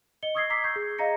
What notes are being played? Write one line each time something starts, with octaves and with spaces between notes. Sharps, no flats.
D#5 C#7 G7
C#6 D#6 E6 G#6 A#6 C7
A#5 D6 E6 B6 C7
C#6 G6 G#6 C7
G#4
D#5 F5 A#5 A#6 C#7